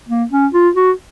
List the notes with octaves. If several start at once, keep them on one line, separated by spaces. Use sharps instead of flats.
A#3
C#4
F4
F#4